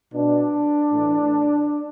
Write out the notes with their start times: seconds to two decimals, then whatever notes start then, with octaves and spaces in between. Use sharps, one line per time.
0.14 B2 D4
0.93 A2 E3